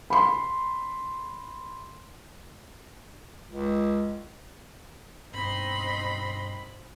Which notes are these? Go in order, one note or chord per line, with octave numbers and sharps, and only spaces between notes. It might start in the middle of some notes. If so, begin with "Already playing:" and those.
B5 C6
C#2
G2 B2 C4 D#4 B5 C6 A#6